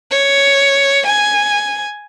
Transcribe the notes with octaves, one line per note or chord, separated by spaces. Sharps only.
C#5
G#5